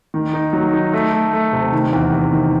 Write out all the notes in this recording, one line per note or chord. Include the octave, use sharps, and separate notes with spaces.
D#3
D#4
F#3
D#4
A3
A3
A3
C3
D#3
E2
C3
D#3